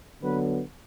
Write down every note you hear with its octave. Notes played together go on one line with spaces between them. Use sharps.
D3 F#3 B3 B4